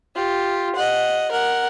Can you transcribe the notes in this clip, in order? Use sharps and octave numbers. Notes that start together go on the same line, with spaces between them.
F4 G4
D#5 F#5
A#4 F#5